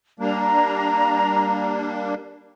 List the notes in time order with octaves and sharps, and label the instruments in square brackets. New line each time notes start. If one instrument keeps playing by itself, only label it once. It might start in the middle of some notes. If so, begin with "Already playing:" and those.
[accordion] G3 A#3 D4 [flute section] A#5